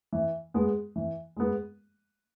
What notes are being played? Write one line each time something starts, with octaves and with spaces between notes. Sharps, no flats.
E3
G#3 B3
E3
G#3 B3